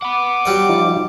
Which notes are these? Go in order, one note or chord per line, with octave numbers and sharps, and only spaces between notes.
F#5 B5 D6
F#3 G3 D5
F3 D#4 F4